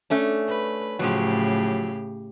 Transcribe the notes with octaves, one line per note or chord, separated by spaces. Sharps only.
A3 C#4 D4
B4
A2 C#3 F3 F#3 G4